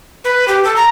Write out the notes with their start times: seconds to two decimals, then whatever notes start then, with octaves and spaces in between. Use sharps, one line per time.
0.24 B4
0.48 G4
0.64 A4
0.76 A#5